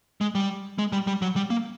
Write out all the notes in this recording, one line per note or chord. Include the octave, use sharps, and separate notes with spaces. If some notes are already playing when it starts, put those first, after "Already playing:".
G#3
G3
G#3
G3
G3
F#3
G3
A#3